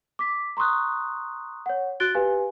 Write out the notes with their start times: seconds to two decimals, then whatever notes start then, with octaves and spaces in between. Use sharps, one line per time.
0.19 D6 B6
0.57 A#5 C6 C#6 D#6 F#6
1.66 C#5 F#5
2.00 F#4 F#6 A6 D7 G7
2.15 G4 B4 F5 G#5